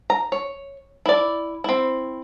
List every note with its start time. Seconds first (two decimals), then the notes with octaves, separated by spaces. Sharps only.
0.10 A#5
0.32 C#5
1.06 E4 D5
1.64 C4 E4